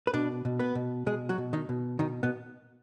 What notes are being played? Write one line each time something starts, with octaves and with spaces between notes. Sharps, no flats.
B4
B2 D4 D5
B2
B3 B4
B2
B2 G#3 G#4
F#3 F#4
B2
D#3 D#4
B2
B2 D#3 D#4
B2 B3